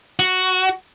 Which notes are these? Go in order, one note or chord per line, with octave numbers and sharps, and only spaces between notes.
F#4